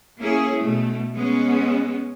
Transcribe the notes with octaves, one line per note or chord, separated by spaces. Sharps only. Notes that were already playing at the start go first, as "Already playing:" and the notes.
A#3 C#4 E4 G#4
B2 A3
G#3 B3 C#4